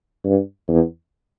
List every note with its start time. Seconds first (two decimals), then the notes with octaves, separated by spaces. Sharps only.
0.25 G2
0.68 E2